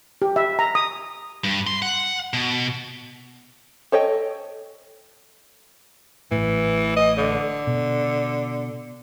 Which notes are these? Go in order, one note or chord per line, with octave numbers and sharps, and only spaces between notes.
G4
E5
A#5
D#6
G2
C6
F#5
B2
A4 C#5 D#5 G5
A1 A2 E3
D#5
D3
B2